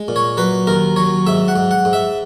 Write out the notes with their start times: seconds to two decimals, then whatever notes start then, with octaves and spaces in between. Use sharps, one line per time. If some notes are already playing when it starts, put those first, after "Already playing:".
Already playing: G#3
0.08 A#2
0.16 C#5
0.37 F#3 B4
0.67 D#2 A#4
0.96 F#3 C#5
1.26 G#2 E5
1.48 F#5
1.56 G#2
1.71 F#5
1.85 G#2
1.93 E5